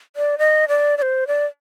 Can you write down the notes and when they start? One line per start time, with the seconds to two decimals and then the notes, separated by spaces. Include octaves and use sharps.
0.16 D5
0.38 D#5
0.68 D5
0.98 D5
1.02 C5
1.27 D5